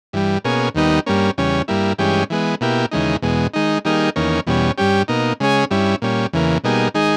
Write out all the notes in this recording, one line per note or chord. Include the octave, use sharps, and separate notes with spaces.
G2 E3 G3
B2 A#3 C#4 G#4
D#2 D#3 G3 B3 D#4
G2 G3 A#3 C#4
E2 C#3 G3 C#4
G2 G3 A#3 E4
G2 E3 G#3 C#4 G4
E3 G#3 B3
B2 A#3 E4 G4
D#2 C#3 E3 G#3 D#4
E2 B2 G#3
D#3 G#3 D#4
D#3 G3 A#3 D#4 G#4
E2 D#3 A#3 C#4
E2 B2 G3 C#4
G2 G3 C#4 G4
B2 A#3 D#4
C#3 G#3 C#4 G#4
G2 G3 C#4 E4
A#2 G3 C#4
E2 C#3 E3 A#3
B2 G3 A#3 D#4 G#4
D#3 G#3 D#4 G#4